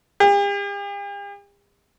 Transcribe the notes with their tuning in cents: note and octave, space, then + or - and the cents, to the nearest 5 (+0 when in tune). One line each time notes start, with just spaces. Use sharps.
G4 +45